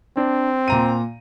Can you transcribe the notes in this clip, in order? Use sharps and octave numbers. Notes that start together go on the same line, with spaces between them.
C4 D4
A#2 A#5 D#7